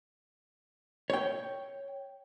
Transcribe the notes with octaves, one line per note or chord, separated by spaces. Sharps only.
C#5 G5